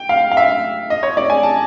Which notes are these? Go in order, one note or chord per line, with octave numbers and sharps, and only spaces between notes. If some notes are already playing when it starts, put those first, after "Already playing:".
Already playing: G5
F5
F5
E5
D#5
C#5
D5
G#5
A5